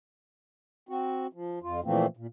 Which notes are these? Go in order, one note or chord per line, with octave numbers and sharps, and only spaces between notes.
C4 F#4
F3
F2 F4
A#2 E3 F3 A3 A#3 C4
A#2